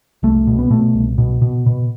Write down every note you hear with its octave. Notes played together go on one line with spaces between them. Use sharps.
C2 A3
B2
B3
B2 A3
C2
B2
B2
B2